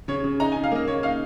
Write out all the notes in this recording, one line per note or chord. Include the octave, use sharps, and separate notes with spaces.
C#3 C#5
C#3
D#4 A#5
G#5
C#3
F5
A#3 D#5
C#3 C#5
D#4 F5